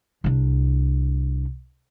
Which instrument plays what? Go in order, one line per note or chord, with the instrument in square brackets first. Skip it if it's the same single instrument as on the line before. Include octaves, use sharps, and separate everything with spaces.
[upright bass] C2 D4